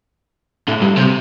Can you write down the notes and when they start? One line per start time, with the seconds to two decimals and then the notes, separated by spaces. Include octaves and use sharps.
0.68 A2
0.82 G2
0.97 C3